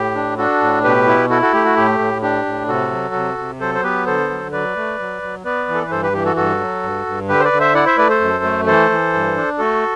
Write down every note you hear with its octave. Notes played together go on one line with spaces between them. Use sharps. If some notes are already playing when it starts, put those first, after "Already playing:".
Already playing: A2 G4
D4
D4 F#4 A4
A2
B2 G4 B4
E4
E4 F#4 A4
F#4 A4
A3 G4
F#4
A2 G4
A2
D4 G4
A2
C3 F#4 A4
F#3
C3
C3
F#3 A4 C5
C5
B3 G4 B4
D3 A4 C5
F#3
F#3 B4 D5
A3
F#3
F#3
B3 B4 D5
E3
A4
B4
G2 A4 C5
G4 B4
E3 G4
F#4 A4
G2 F#4 A4
F#3
G2
G2
D3 G4 B4
C5
B4 D5
D3
C5 E5
E4 D5 F#5
C5 E5
A3 B4 D5
A4 C5
F#2
A3
E3 A4 C5
E3
G2
D4
A3 F#4 A4